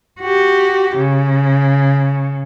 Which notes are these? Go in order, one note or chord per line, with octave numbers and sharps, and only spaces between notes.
F#4 G4
C#3